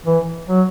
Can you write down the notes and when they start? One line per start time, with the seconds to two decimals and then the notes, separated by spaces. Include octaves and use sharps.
0.06 E3
0.49 F#3